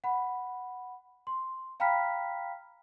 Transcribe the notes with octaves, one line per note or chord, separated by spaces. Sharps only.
F#5 B5
C6
F5 G5 A#5 B5 F6 B6